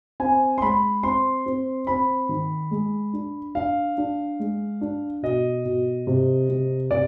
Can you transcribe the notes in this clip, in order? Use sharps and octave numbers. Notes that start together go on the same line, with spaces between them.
C4 G#5
C6
G#3 B5
C4 C6
C4
C4 B5
D#3
G#3
D4
D4 F5
D4
G#3
D4
B2 D#5
B2
C3
C3
C3 D5